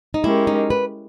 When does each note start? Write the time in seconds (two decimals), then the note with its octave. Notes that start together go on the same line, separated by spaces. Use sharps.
0.14 D#4
0.24 G#3 C#4 E4 G4 A#4
0.47 D#4
0.70 B4